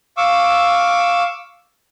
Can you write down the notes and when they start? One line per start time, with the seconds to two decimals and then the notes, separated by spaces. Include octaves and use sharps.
0.17 F5 C#6 D6 E6